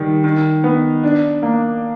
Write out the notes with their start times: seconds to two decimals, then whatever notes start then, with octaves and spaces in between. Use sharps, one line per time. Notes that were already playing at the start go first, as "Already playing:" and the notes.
Already playing: D#3 G3
0.24 D#3
0.64 B3
1.03 D4
1.43 A#3